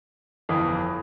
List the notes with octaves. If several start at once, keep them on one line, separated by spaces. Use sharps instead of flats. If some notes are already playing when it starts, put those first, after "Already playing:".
G1 F2 E3